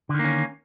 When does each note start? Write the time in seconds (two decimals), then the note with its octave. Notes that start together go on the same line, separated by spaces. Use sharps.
0.09 D3
0.14 D#3
0.19 A#3
0.24 C#4